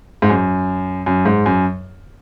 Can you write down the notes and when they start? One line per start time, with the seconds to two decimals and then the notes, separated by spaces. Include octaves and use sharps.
0.22 G#2
0.30 F#2
1.06 F#2
1.25 G#2
1.46 F#2